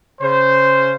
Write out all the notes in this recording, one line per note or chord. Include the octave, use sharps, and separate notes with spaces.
C#3 C5